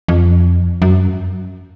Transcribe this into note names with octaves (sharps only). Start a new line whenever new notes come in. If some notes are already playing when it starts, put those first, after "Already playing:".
F2
F#2